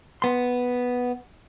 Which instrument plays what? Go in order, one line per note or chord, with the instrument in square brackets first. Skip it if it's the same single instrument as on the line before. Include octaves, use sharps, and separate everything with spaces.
[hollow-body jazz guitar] B3 C6